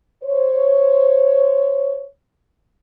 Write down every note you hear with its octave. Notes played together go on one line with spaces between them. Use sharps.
C5 C#5